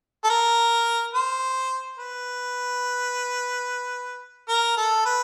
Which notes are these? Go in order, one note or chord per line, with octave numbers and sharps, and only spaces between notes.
A4
A#4
C5
B4
A#4
A4
B4